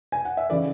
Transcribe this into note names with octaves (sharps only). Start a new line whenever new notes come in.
G#5
F#5
E5
C#3 E3 A3 D5